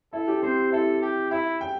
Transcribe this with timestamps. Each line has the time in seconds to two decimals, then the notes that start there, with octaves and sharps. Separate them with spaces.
0.13 E4 A4
0.28 G4
0.42 C4 C5
0.72 E4 A4
1.02 G4
1.31 E4 E5
1.61 G5